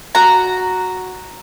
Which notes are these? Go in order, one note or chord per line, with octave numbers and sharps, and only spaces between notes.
F#4 A#5